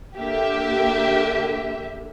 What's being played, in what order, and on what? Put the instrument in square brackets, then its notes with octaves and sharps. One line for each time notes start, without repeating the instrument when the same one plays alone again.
[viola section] D3 A#3 [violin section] G4 E5